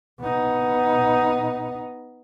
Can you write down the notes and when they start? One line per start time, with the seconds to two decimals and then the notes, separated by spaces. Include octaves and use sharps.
0.20 B3 D#4